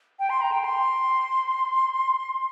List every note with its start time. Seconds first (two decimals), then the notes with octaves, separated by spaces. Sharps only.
0.19 G5
0.29 C6
0.41 A#5
0.52 G5
0.64 C6